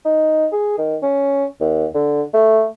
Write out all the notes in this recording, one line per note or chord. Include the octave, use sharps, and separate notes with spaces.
D#4
G#4
D#3
C#4
D#2
D3
A3